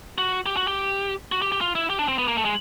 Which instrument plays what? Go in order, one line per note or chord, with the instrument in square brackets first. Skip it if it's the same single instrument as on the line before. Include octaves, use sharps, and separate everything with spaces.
[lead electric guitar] F#4
G4
F#4
G4
F#4
G4
G4
F4
E4
G4
D4
C4
B3
A#3
A3
G#3